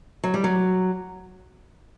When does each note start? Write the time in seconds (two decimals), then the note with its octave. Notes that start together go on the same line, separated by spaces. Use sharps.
0.24 F#3
0.34 G3
0.44 F#3